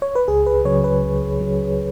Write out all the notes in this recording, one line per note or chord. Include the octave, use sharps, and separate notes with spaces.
C#5
B4
C#2 G#4
B4
C#3 F#3 C#5
B4
C#2
C#3 F#3